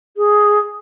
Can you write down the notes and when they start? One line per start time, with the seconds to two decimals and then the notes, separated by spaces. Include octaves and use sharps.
0.16 G#4